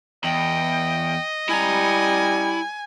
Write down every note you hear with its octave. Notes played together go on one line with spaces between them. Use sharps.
E2 D#5 G5
G3 E4 G#5 A#5